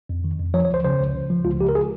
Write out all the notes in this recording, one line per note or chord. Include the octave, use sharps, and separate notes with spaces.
F2
D#3
F2
F3 C#5
C#5
C#2 C5
C#3 C5
C#2
C#3
F3
C#2 F4
C#2 G4
A#4
G#4